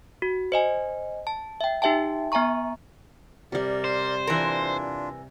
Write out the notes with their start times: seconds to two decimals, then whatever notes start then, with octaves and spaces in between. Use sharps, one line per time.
0.22 F#4
0.52 C5 D#5 G#5
1.27 A5
1.61 E5 G5
1.82 D#4 G4 E5 G5 A5
2.32 B3 E5 G#5 A#5 C#6
3.52 C3 G3 A#4 D5
3.84 C5
4.27 E3 D4 F4 A#4